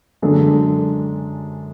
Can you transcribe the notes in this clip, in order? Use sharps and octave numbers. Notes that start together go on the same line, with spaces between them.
F#2 D3 G#3 D4 A4